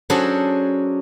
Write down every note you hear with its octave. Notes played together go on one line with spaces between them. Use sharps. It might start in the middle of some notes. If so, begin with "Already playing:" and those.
F#3 C#4 D4 G#4 A4 C5